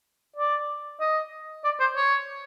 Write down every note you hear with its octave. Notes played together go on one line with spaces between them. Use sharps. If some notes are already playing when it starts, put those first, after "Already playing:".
D5
D#5
D5
C5
C#5